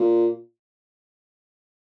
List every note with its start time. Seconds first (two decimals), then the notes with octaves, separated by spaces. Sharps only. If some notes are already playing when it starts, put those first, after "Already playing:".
Already playing: A#2